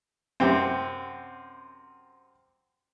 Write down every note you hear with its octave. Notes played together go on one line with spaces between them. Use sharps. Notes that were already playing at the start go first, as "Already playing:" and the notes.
F#2 C3 C4